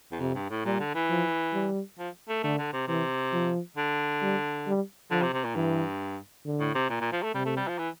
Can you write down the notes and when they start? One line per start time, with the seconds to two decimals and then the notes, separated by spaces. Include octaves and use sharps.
0.12 E2
0.20 F2 C3
0.35 G2
0.50 A2
0.65 A#2 G3
0.80 D3
0.95 E3
1.10 F3
1.54 G3
1.99 F3
2.28 A3
2.43 D3 A3
2.58 D3
2.73 C3
2.88 C3 E3
3.33 F3
3.77 D3
4.22 G3
4.67 G3
5.11 D3 F3
5.22 C3
5.33 C3
5.44 A#2
5.55 G2 E3
6.45 D3
6.60 A2
6.75 C3
6.90 A#2
7.01 A#2
7.12 F3
7.23 A3
7.34 C3 G3
7.46 A3
7.57 G3
7.68 F3
7.79 E3